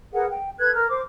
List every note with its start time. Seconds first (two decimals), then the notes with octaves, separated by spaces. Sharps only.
0.13 G#4 A#4 B4 F#5
0.30 G5
0.59 A4 B4 F#6 G#6
0.75 A#4 A#5 F6
0.90 C5 D6